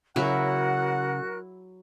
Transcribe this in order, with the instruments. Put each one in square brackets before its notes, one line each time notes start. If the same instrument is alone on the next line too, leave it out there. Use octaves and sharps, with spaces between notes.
[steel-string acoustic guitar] C#3 [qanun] F#3 E4 [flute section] F#4 A#4 F#6 [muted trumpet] F#5